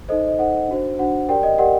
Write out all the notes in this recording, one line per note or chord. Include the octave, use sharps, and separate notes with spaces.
D#4 A4 C5 D#5
D#5
D#4 A4 C5 F#5
D4 F#4 C5
D4 F#4 C5 F#5
G4 A#4 D5 G5
D#5
G4 A#4 D5 F#5